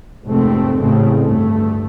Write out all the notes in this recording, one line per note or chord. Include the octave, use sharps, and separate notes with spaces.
F1 D#2 G#2 C3 A3 C4
A1 C#3 A3 C4
D2 G2 A3